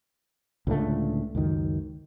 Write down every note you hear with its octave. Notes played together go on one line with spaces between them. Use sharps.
C#2 A2 D3 A3
C#2 F#2 D#3